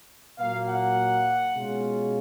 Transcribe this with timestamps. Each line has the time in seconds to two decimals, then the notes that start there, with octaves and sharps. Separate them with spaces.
0.39 A#2 F#3 A#3 F5
0.68 F#5
1.54 B2 G#3 C#4 F4